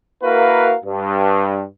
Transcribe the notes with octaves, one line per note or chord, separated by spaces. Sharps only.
A#3 E4 F#4 A#4 B4 F5
G2